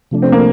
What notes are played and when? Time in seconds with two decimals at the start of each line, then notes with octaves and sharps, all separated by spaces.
0.11 C3 F3 A3 D4
0.22 C4
0.32 A#3